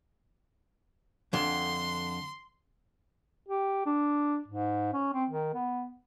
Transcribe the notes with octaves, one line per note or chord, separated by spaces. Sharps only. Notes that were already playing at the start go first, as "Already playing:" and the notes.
F2 D3 C6
G4
D4
G#2
C#4
C4
D#3
B3